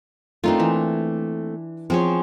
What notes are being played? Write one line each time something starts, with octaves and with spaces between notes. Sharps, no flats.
A3 A#3 C4 D4 D#4 F4
E3
F3 B3 C4 G#4 C#5